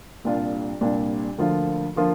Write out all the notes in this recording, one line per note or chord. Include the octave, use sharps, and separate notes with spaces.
C2 A#2 G3 D4 F4
C2 A#2 G3 D4 F4
D2 D3 F3 A#3 F4
D3 F3 A#3 F4